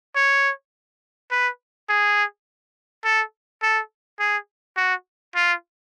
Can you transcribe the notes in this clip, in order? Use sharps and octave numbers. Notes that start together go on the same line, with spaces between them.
C#5
B4
G#4
A4
A4
G#4
F#4
F4